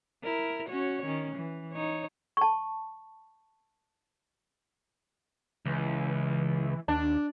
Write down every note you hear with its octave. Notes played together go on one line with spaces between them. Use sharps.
E4 A#4
C#4 F#4 C#5
D#3 C#4
E3
D#4 C#5
A5 C#6
C#2 E3
D#2 D4